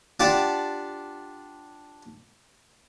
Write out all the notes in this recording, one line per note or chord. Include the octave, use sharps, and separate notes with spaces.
D4 F4 G4 D5 F#5 A5